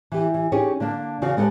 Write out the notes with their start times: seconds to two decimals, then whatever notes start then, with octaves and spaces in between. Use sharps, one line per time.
0.12 E3 G4
0.34 E3
0.52 C#4 D#4 G4 G#4 C#5
0.80 D3 A#3 D4
1.22 E2 C#3 F#4 D5 F5
1.37 G#3 B3 G4 A4 C#5